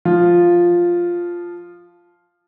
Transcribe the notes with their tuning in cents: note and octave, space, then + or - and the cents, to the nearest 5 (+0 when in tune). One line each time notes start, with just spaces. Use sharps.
F3 +0 F4 +0